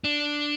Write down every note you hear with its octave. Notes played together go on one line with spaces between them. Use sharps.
D4